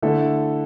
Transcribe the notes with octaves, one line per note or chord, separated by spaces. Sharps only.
D3 A3 E4 A4